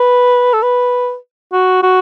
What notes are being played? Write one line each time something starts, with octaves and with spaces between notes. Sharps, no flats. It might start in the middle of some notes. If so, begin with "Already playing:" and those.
Already playing: B4
A4
B4
F#4
F#4